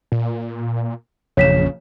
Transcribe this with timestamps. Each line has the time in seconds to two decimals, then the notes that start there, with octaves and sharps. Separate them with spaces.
0.12 A#2
1.37 A#1 F#2 C#3 C#5 B6 E7